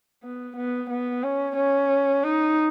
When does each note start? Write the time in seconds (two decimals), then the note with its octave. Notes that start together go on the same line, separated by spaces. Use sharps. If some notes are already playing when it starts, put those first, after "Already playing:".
0.23 B3
0.57 B3
0.90 B3
1.23 C#4
1.56 C#4
2.24 D#4